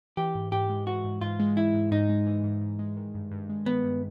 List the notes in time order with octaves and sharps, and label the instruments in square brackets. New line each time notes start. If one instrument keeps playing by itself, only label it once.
[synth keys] E3 [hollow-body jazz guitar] G4
[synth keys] G#2
[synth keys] G#2 [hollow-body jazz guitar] G4
[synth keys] G#3
[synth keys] E3 [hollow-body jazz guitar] F#4
[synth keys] G#2
[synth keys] G#2 [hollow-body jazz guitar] F4
[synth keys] G#3
[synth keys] E3 [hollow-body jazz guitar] E4
[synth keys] G#2
[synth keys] G#2 [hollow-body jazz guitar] D#4
[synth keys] G#3
E3
G#2
G#2
G#3
D#3
G2
G2
G#3
[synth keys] D#3 [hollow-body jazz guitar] B3
[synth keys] G2